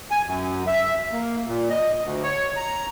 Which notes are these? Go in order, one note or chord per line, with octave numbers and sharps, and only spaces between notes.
G#5
F#2
E5
A#3
A#2
D#5
D2
C#5
A#5